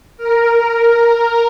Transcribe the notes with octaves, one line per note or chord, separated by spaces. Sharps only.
A#4